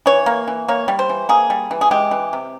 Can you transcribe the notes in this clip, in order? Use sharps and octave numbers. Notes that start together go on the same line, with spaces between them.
E3 C#5
A#3
E3
A#3 C#5
G3
C5
E3
A#3 G#4
G3
E3
G#4
G#3 G4
E3
C3